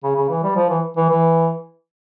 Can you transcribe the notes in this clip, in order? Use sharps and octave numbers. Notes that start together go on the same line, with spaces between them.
C#3
C#3
E3
G3
F3
E3
E3
E3